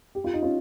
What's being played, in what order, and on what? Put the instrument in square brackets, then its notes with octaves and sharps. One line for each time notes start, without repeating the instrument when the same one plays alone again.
[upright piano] G4
F4
D#4
C#4 F4